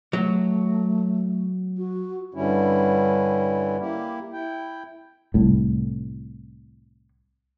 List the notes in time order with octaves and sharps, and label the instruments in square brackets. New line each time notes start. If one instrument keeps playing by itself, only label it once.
[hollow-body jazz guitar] F#3 [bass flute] A3
[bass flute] F#4
[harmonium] G2 D3 G3 C#4 E4
A#3 E4 G4
E4 G5
[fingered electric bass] C2 A2